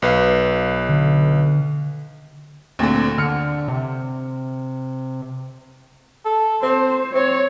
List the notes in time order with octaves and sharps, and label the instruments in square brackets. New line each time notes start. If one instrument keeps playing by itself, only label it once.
[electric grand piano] B1 B4 F5
[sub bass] D3
[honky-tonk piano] D2 A#2 D3 [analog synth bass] C4
[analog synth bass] D3 [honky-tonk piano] F6 C#7
[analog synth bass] C3
[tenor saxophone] A4
[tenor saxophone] C4 [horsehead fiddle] C5
[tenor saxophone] C4 [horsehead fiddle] C#5